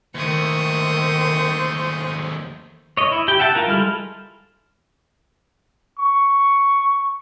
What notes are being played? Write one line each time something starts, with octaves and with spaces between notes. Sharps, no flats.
D#2 D#3 A3 C5 C#6 D#6
C#5 D#5
E4
G4 G5
E5 F#5 G5 A5
F4 A#4
G3 G#3 E4 A4 F6
C#6